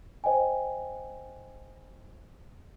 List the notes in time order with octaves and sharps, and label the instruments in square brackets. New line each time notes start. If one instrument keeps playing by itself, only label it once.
[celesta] C5 D#5 G5 G#5